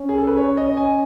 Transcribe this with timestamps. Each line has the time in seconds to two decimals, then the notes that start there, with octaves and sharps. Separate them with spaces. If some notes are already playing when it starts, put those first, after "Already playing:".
Already playing: C#4
0.09 G#4
0.18 A4
0.27 B4
0.37 C#5
0.57 D#5
0.77 G#5